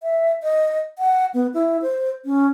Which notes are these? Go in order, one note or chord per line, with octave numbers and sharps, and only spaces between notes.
E5
D#5
F#5
B3
E4
C5
C#4